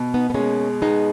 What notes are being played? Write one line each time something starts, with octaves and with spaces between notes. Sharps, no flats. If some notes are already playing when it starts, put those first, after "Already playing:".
Already playing: B2
B3 D#4
B3
G#3 A#3 C#4
G#3 B3 D#4